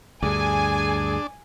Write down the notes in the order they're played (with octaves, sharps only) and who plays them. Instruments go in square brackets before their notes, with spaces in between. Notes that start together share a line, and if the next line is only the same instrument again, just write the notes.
[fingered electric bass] D2 G2 [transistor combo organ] D4 [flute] G#4 [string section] G#5